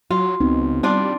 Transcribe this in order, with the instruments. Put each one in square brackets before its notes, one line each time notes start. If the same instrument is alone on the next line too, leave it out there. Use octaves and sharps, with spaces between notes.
[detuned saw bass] F#3 [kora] F4 [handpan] F#4
[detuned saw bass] C#2 [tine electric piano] B3 [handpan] C4 D#4
[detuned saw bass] G3 [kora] D4 F4 D5